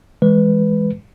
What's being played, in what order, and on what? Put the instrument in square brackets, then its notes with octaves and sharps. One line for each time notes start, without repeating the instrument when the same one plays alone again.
[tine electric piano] E3 G#3 B4